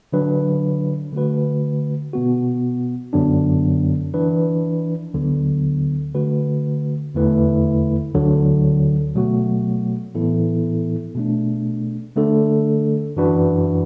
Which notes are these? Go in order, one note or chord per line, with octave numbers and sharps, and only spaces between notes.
D3 F#3 D4 B4
D3 A3 F#4 B4
B2 B3 F#4
F#2 D3 F#3 B3 D4
E3 D4 B4
D2 D3 F#3 B3
D3 A3 F#4 B4
E2 D3 A3 E4 B4
D2 D3 F#3
B2 F#3 A3 F#4
A2 E3 B3 E4 A4
B2 A3 D4
D3 A3 D4 A4
F#2 E3 D4 F#4 B4